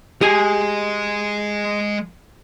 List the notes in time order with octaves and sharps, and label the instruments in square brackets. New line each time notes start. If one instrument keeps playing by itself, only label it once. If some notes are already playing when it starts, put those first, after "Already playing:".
[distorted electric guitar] G#3 [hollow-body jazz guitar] G4 G#4 G#5